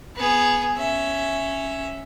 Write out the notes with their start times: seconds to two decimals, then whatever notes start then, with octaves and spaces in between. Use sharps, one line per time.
0.15 B3 G#4
0.77 C#4 E5